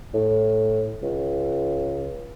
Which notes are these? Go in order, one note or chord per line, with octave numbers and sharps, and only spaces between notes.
A2
C#2